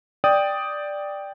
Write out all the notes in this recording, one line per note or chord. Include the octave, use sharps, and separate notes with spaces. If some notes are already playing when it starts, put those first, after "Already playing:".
D5 G5 D#6